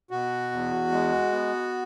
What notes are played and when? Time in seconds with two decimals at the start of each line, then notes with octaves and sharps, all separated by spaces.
0.11 B2 F#4
0.52 E2
0.92 G#3
1.32 B3